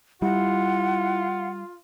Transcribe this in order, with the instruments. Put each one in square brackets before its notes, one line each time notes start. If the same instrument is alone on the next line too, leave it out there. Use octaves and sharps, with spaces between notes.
[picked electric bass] G3 [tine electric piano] E4 [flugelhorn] F4 [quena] F#5